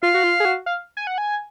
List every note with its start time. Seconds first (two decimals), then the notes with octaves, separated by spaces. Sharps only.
0.03 F4 F5
0.14 F#4
0.23 F4
0.40 G#4
0.45 F#4
0.66 F5
0.97 G#5
1.07 F#5
1.18 G#5